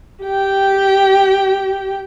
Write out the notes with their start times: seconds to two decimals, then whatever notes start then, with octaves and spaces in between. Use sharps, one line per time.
0.24 G4 G5